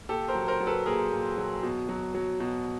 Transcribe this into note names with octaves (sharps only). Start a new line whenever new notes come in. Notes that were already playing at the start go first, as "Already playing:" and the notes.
A#2 G4 A4
A#4 C5
F#3
A#4 C5
F#3
A4 B4
A#2 G#4 A#4
A#2
F#3
B2
F#3
F#3
B2